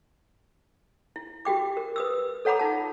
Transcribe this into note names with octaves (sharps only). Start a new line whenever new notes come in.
E4
F#4 G4 G5 D6
A#4
B4 D#6 E6
A4 C#5 F#5 A#5 B5 D6
D#4 F4 A5